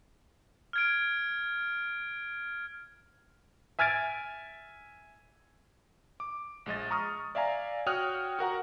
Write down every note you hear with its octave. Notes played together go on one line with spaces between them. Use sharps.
F6 G#6 D7
E5 G#5 F6 G#6 A6 D7
D6
A#1 G#3 D#5 A6
A#5 C#6 D#6 F6
D5 E5 F5 G#5 A#5
F#4 C#5 G5 D#6 F6 F#6
F#4 A#4 F#5 A#5